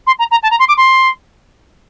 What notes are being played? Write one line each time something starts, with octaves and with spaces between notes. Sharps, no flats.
C6
A#5
A#5
A5
A#5
C6
D6
C6